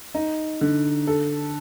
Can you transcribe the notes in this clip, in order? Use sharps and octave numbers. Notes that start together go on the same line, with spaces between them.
D#4
D3
A4